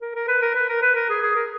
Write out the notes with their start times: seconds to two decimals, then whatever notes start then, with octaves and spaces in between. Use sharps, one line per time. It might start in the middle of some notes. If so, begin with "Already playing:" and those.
0.01 A#4
0.15 A#4
0.28 B4
0.42 A#4
0.55 B4
0.69 A#4
0.82 B4
0.95 A#4
1.09 G#4
1.22 G#4
1.36 A#4